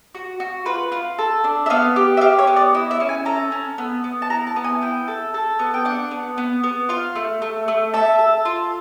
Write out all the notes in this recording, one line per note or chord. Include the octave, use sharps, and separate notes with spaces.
F#4
F#4
F4 B4
F4
A4
D4
E5
B3 F5
G4
E5
G4 F5
C#5
B3
D5
E4 D#5
E5
C#4
G#5
A4 A#5
C#4
B3
B3
A5
E4 A#5
A5
B3
G#5
E4 G5
A4
A4
B3
G5
D4 F#5
B3
B3
B3
F4 F5
A3
A3
A3
A4 E5
A4
F4